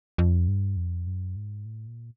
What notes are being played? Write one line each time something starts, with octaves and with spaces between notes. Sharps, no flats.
F2
G2
F2
F#2
G#2
A2
A#2